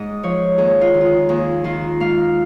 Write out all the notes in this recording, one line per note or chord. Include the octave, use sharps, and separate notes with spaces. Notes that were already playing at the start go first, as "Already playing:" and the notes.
Already playing: G#2 D#5
F3 C#5
D#2 G#4
F4
D#3
F4 G#4
D#2 G#4
D#3 F4
G#2 F5